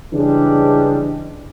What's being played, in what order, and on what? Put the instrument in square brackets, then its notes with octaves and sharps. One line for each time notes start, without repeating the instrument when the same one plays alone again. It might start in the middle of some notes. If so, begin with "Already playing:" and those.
[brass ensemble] C#3 E3 G3 G#3 D4